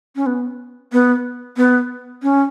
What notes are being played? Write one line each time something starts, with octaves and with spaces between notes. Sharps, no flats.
C#4
B3
B3
B3
C#4